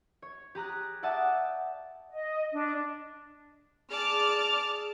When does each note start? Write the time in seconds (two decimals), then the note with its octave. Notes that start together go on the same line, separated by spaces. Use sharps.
0.22 C#5
0.55 G4 G#4 A#5 F#6
1.03 D5 E5 F#5 G5 A5 D#6
2.10 D#5
2.53 D4
3.90 G#4 D5 A5 D6 F6